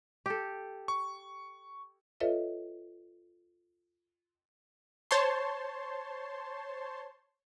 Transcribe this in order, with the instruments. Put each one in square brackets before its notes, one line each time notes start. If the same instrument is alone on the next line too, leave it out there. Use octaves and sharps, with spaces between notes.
[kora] G4 A4
[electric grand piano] C#6
[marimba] F4 A4 B4 C#5 D#5 E5
[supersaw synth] C5 C#5 A5 C6